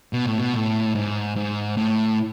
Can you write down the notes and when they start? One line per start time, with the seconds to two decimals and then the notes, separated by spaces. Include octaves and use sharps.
0.13 B2
0.26 A2
0.38 B2
0.54 A2
0.95 G#2
1.36 G#2
1.77 A2